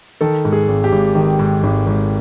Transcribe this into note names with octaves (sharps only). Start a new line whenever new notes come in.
D#3 A4
G#2
G#4
G#1
G4
G#1
D#3
G#2
G#1
G#1